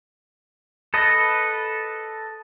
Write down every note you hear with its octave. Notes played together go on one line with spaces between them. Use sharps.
A4 B4 D#5